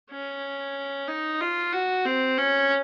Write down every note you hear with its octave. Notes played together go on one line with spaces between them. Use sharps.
C#4
D#4
F4
F#4
C4
C#4